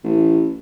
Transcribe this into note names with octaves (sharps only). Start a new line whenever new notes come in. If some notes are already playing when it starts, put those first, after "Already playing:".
A1